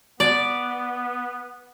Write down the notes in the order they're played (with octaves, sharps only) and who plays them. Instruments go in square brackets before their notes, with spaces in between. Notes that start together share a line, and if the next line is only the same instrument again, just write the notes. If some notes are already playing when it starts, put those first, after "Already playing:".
[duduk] B3 [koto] D5